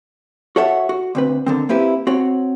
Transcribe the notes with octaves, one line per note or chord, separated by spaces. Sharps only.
F#4 A4 C#5 E5 F#5
F#4
D2 C4 B4
D3 D#3 C4
A#3 C4 E4 G4 B4
C4 F#4 C#5